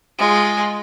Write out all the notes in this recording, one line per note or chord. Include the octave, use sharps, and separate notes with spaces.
G#3 F4